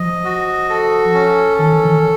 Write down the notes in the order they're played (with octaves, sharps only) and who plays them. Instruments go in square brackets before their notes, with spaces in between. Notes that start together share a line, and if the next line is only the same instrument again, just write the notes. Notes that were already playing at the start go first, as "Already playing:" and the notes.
Already playing: [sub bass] F3 [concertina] D#5
[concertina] F#4
A4
C#4
[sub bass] D#3 [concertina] A4
[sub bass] E3
D#3